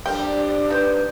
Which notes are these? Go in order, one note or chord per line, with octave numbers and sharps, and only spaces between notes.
G3 C4 D4 A#4 G5
D#4 G4 B4 C5